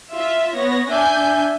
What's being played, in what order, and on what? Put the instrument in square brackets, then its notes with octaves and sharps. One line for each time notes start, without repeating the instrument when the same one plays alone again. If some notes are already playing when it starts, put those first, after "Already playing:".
[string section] F4 E5
B3 C#5 A#6
[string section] D4 G#5 G6 [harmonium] E5